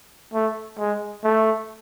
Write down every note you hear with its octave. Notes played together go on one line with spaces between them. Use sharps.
A3
G#3
A3